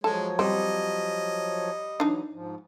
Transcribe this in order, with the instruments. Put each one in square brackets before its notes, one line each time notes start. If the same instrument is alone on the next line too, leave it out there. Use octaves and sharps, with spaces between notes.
[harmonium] F3 F#3 C#5 [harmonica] G#3 [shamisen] A4
[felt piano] G3 [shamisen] C4 [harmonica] D#5
[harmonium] E3 F#3 [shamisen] D4 D#4
[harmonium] G#2 F3